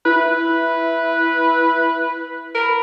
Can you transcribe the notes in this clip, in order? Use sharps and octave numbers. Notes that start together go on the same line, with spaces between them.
E4 B4
A#4 B5